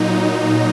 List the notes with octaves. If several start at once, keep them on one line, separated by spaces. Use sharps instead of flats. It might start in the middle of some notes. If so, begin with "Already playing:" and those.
Already playing: A#2 F#3 D#4